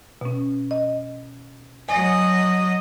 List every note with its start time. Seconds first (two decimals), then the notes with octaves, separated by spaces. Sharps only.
0.21 B2 C#4
0.71 D#5
1.89 F#3 D#5 G#5